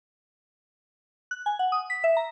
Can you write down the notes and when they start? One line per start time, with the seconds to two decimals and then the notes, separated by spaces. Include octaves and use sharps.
1.31 F#6
1.46 G#5
1.59 F#5
1.72 D#6
1.90 B6
2.04 E5
2.17 A#5